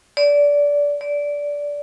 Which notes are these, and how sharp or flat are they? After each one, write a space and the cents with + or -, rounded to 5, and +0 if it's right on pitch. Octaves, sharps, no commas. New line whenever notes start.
D5 -20
D5 -15